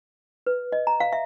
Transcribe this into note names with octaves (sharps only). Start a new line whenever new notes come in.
B4
D#5
A#5
F5
E5